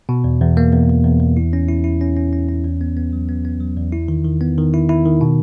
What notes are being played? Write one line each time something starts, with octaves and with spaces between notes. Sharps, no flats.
B2
E2
E2
A#3
E2
E2
E2
E2
E4
C#4
E4
E4
C#4
C#4
C#4
C#4
E2
B3
B3
F#3
B3
B3
F#3
E2
E4
D#3
D#3
B3
D#3
E4
E4
D#3
B2